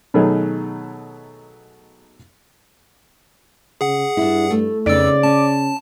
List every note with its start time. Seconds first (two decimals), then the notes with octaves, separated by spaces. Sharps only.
0.14 B2 D#3 F#3 A3 D#4 G#4
3.81 C#3 G#4 F#5
4.17 G2 D4 E4
4.50 A3
4.86 F2 C#3 B3 D#4 D5 E6
5.23 C#4 A5